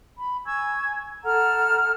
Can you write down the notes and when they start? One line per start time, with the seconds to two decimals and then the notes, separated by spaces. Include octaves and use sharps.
0.17 B5
0.46 G#5 C#6 E6 G#6
1.24 A4 F#5 A#5 F6